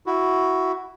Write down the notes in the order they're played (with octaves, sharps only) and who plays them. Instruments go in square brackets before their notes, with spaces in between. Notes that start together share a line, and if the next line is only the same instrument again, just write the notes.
[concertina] E4 F#4